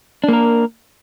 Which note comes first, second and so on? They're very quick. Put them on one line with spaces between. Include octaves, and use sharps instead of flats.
D4 A#3 A#4